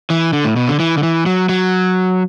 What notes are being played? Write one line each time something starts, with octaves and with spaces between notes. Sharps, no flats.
E3
D3
A2
B2
D3
E3
D3
E3
F#3
F#3